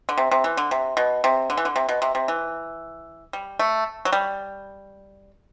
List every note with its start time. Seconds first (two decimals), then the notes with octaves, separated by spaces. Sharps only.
0.09 D3
0.18 C3
0.31 C3
0.44 E3
0.57 D3
0.71 C3
0.97 B2
1.24 C3
1.50 D3
1.57 E3
1.65 D3
1.76 C3
1.89 B2
2.02 C3
2.15 C3
2.28 E3
3.33 G3
3.59 A3
4.05 F#3
4.13 G3